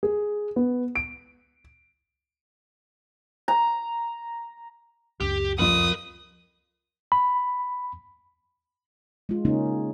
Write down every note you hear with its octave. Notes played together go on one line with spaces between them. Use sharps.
G#4
B3
D7
A#5
C#2 F#2 D4 G4
F2 F4 A#4 B5 D#6
B5
G#3 F4
C#3 A#3 C#4 D#4